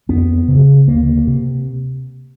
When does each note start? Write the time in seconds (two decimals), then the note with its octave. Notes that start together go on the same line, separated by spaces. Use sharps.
0.09 F2 B3
0.48 C#3
0.88 D2 A#3
1.27 C3